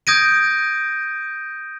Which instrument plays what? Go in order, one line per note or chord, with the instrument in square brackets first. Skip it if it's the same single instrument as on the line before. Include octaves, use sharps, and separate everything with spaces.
[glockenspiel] D#6 G6 G#6 A#6 D7 D#7